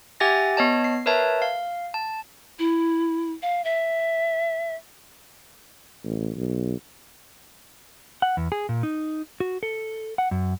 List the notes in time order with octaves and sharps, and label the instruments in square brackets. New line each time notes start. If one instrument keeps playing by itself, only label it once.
[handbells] G4 E5 F#5 G#5 A6 A#6
B3 C#5 D#5 A5
C7
A#4 B4 C#5 E5 A5
F5
A5
[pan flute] E4
F5
E5
[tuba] A1
B1
[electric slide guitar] F#5
E2
G#4
A#2
D#4
F#4
A4
F#5
F#2